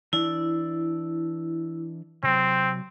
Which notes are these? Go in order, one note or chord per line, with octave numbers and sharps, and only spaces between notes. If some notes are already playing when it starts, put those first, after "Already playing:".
E3 D4 E4 D5
C3 F#3 C4